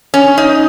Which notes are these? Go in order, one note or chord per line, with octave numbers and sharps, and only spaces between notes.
C#4
D#4